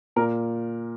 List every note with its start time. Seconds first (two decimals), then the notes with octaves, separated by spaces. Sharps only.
0.16 A#2 A#4